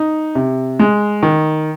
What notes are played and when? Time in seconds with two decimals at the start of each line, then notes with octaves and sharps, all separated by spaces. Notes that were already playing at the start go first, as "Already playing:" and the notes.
Already playing: D#4
0.35 C3
0.79 G#3
1.23 D#3